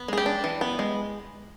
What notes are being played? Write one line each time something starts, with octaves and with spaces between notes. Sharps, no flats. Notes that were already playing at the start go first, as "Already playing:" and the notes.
Already playing: B3
G#3 G#4
G4
D4
E3
B3
G#3